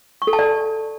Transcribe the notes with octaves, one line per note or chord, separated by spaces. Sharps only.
C#6
A4
A5
D5